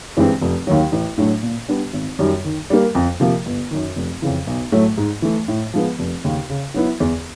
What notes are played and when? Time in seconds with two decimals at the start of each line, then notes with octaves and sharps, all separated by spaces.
0.17 G2 E3 G#3 C4
0.41 F1
0.67 D#2 D#3 F#3
0.92 A1
1.18 A2 F#3 A3 D4
1.43 A#2
1.68 G3 B3 D4 G4
1.93 G#1
2.19 F#2 D#3 G3
2.45 D#3
2.70 G3 A#3
2.95 F2
3.20 C3 F3 A#3
3.46 G1
3.71 F#2 D#3
3.96 F1
4.22 F2 C#3 E3
4.47 B1
4.72 A2 F#3 A3
4.98 G#2
5.22 E3 A3
5.48 A2
5.74 F3 G#3 B3
5.99 F1
6.24 D#2 C#3
6.50 C#3
6.74 F#3 B3 E4
7.00 E2